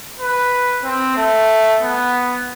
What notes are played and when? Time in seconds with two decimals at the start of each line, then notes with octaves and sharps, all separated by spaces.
0.20 B4
0.84 C4
1.16 A3
1.80 B3